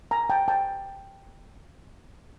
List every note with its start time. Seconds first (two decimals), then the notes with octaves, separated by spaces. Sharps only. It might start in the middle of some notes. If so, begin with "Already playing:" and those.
0.11 G#5 A#5
0.30 G5 A5
0.48 G5 A5